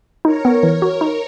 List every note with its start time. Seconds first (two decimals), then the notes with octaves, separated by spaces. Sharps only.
0.25 D#4 A#4 C#5
0.45 B3
0.63 E3
0.82 F#4
1.01 D#4